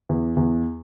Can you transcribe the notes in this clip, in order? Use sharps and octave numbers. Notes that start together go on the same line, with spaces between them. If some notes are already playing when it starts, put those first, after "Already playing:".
E2
E2